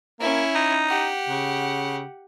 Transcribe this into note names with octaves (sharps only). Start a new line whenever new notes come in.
A#3 C#4 E4
D#4
G4 F#5
C#3